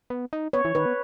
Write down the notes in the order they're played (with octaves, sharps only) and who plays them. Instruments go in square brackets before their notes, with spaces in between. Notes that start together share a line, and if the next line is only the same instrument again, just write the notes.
[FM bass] B3
D#4
[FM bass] B3 [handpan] C#5
[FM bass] E3
[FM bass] D#3 [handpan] B4
[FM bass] B3